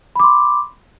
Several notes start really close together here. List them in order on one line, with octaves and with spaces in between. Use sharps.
B5 D6 C6